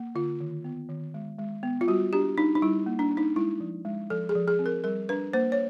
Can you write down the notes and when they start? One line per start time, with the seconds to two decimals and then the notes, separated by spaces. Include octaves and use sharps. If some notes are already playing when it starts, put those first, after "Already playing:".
Already playing: A#3
0.15 D3 F4
0.41 D#3
0.64 B3
0.89 D#3
1.14 G#3
1.39 G#3
1.63 B3
1.81 F4
1.88 G3 F#4
2.13 D4 G4
2.38 D4 D#4
2.55 D#4
2.62 G3 E4
2.86 A#3
2.99 D4
3.11 D4
3.17 D#4
3.36 G#3 E4
3.60 F3
3.85 G#3
4.10 F3 A4
4.29 G#4
4.35 F3
4.48 G#4
4.59 C4
4.66 A#4
4.84 G3 A#4
5.09 D4 B4
5.33 A#3 C5
5.52 C#5